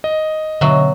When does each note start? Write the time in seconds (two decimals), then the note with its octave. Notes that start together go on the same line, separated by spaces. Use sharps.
0.04 D#5
0.61 B2 D3 F#3 E5